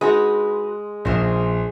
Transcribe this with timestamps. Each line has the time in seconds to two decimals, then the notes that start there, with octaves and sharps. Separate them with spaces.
0.01 G#3 D#4 F#4 B4
1.05 A#1 C#3 A#4 C5